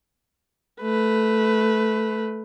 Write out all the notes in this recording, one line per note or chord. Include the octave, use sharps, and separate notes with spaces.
A3 B4